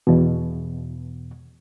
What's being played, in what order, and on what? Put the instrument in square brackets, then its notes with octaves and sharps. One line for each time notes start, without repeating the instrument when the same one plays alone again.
[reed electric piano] E2 B2